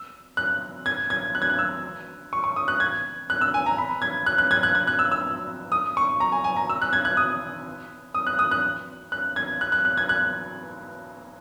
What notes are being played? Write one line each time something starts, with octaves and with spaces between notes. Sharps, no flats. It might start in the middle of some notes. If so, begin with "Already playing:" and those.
Already playing: E6
F#6
G#6
G#6
F#6
G#6
F#6
E6
C#6
C#6
D#6
F#6
G#6
F#6
E6
G#5
A#5
B5
G#6
F#6
F#6
G#6
F#6
G#6
F#6
E6
E6
D#6
C#6
A#5
G#5
G#5
A#5
E6
F#6
G#6
F#6
D#6
D#6
F#6
D#6
F#6
F#6
G#6
F#6
F#6
F#6
G#6
F#6